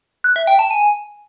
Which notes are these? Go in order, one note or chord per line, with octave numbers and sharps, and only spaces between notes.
F#6
E5
G5
A5
G#5